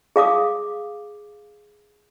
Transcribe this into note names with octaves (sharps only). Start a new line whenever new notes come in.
G#4 F5 D6 D#6